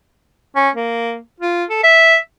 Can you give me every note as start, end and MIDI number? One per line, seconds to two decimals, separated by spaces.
0.56 0.70 61
0.75 1.18 58
1.40 1.64 65
1.69 1.80 69
1.83 2.17 76